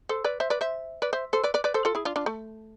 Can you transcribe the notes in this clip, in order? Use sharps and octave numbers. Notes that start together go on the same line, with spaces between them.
A4 C5
B4 D5
C5 E5
B4 D5
C5 E5
B4 D5
C5 E5
A4 C5
B4 D5
B4 D5
B4 D5
A4 C5
F4 A4
E4 G#4
D4 F4
D4 F4
A3